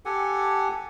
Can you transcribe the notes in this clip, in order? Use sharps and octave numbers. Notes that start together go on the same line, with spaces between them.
G4 A4 F#5 G#5